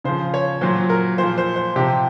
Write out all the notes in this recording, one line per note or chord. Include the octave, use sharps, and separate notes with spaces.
C#3 F3 C5
C#5
A#2 F#3 C5
A#4
A#2 F3 C5
C5
C5
C3 F3 G4